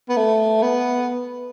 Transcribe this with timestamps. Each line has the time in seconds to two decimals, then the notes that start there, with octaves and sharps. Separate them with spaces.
0.09 B3
0.17 A3
0.63 B3